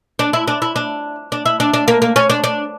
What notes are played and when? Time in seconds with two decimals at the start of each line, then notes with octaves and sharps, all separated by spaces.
0.19 D4
0.33 E4
0.48 D4
0.62 E4
0.76 D4
1.32 D4
1.46 E4
1.60 D4
1.74 D4
1.88 A#3
2.02 A#3
2.16 C#4
2.30 D4
2.44 D4